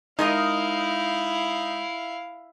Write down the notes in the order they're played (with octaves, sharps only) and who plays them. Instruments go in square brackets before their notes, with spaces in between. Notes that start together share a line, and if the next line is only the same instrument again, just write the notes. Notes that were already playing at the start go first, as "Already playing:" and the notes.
[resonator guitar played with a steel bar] G#3 A#4 D#5 [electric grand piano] D#4 [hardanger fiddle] E4 F5